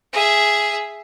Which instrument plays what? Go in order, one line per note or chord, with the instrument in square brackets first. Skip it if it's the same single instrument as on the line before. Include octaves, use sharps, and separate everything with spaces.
[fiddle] G#4 E5